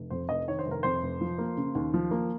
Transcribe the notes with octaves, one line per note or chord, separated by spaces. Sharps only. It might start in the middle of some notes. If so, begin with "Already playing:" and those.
Already playing: F1
F2 C5
F1 D#5
D#3 C#5
C5
F1
A#4
F2 C5
F1
F3
A#3
C#3
D#2
F3
A#3